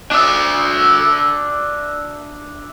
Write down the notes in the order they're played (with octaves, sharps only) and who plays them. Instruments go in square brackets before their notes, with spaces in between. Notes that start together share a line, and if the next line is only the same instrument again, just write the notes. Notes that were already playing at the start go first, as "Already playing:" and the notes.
[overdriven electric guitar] D4 E5